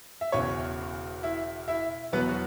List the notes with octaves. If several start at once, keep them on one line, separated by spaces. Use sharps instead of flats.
E5
E1 E2 C#3 C#4 C#5
E4 E5
E4 E5
E2 B2 F#3 B3 B4
F#4